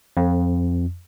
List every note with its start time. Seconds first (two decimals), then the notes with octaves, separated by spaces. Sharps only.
0.17 F2